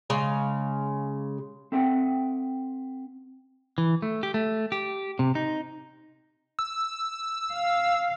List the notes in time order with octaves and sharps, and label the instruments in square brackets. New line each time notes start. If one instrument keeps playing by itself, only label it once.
[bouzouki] C#3 G#3 F5
[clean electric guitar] C4 A4 E5 F#5 G5
E3
A3
G4
A3
G4
C3
D#4
[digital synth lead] E6
[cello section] F5